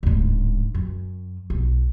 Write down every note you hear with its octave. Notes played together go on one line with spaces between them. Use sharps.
D1 G#2
F#2
B1